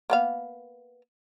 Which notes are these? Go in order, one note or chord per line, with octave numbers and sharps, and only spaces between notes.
A#3 B3 F5